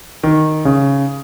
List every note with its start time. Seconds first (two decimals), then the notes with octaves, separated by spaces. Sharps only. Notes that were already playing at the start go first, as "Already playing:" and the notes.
0.23 D#3
0.65 C#3